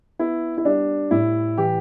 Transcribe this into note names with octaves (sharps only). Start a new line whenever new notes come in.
B3 E4
E4
G3 D4
A2 E4
E3 G4